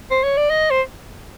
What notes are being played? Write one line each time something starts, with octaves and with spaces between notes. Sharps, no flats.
C5
C#5
D5
D#5
C5